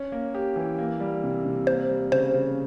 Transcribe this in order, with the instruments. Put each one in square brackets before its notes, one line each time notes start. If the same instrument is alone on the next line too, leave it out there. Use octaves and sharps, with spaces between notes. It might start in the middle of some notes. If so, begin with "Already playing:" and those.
Already playing: [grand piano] C#4
A#3
G4
E3
A#3
G3
C3
C3
[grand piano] A#3 [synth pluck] C5
[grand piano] G3
[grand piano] C#3 [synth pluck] C5
[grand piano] C#3